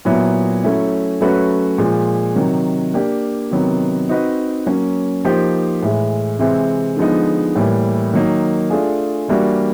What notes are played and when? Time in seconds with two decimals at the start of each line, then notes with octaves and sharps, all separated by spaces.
0.05 A#2 F#3 B3 E4
0.64 F#3 A3 C#4 E4
1.21 F#3 A3 C#4 F#4 B4
1.78 A#2 F3 G#3
2.36 C3 D#3 F#3
2.94 A#3 D4 G4
3.51 C3 D#3 F#3 B3
4.09 C4 D#4 F#4 B4 D#5
4.66 F#3 A#3 C#4
5.24 F3 A#3 D#4 G4 C5
5.83 A2 E3 G#3
6.39 C3 E3 G#3 C4
6.97 D3 F3 G#3 B3 D#4
7.56 A2 E3 G3 A#3
8.13 D#3 F#3 A#3 D#4
8.70 A3 D4 F4 G#4
9.28 E3 G3 A#3 D4 F#4